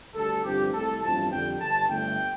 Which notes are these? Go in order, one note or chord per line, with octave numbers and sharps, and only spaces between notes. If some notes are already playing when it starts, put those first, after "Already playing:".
D2 D3 G3 A4
G2 D3 F3 C4 G4
C2 C3 A3 A4
A1 G2 F3 C4 A5
F2 D3 G3 G5
G1 G2 D3 A5
G1 G2 D3 A3 G5